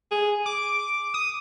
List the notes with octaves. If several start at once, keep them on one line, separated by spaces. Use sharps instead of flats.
G#4
D6
D#6